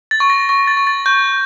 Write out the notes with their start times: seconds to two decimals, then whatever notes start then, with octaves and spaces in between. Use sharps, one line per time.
0.11 A6
0.20 C#6
0.30 A#6
0.49 C#6 A#6
0.67 A6
0.77 C#6
0.87 A6
1.06 C#6 G6